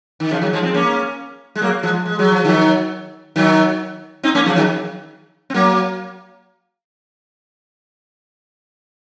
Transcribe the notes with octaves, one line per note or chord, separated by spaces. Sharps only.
D#3
C#3 F3
D#3 F#3
F3 G#3
G#3 C4
A#3 C#4
G#3
F#3 A#3
F3 G#3
G#3
F#3
F3
D#3 F#3
D#3 F#3
C4 D#4
A#3 C#4
C#3 F3
D#3 F#3
C4
F#3 A#3